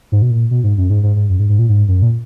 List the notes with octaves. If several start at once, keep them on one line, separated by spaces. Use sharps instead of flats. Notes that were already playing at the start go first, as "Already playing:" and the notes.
G#2
B2
A#2
B2
G#2
F#2
G#2
G#2
G#2
F#2
G#2
G#2
A#2
G#2
F#2
A#2